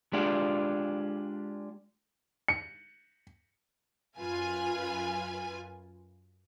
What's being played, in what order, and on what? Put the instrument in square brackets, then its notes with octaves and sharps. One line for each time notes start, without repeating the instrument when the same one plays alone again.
[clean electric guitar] G#3 D4 F4 G4
[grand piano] C#7
[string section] F#2 F4 B4 G#5